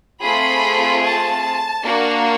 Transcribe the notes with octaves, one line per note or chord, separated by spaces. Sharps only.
A3 C4 F4 G#4 B5
A5
A#3 D4 F#4